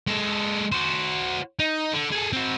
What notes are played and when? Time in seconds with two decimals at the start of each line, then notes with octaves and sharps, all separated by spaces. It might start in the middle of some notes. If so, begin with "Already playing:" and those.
0.07 G#3 A4
0.72 F#4 C5
1.59 D#4
1.93 D3
2.12 G#4 A4
2.33 C4 F#4